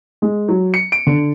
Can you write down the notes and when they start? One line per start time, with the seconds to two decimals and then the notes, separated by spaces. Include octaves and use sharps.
0.22 G#3
0.49 F#3
0.74 C#7
0.92 D7
1.07 D3